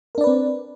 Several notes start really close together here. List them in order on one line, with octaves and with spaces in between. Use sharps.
A#4 D4 D5 B4 C4